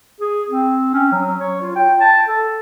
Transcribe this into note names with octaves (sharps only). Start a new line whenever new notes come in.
G#4
C4
C#4
F#3
C#5
F4
G5
A5
A4